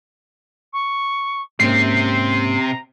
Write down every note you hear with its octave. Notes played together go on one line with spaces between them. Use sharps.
C#6
G#2 C3 A#3 C4 C#4 G6 C7
A#5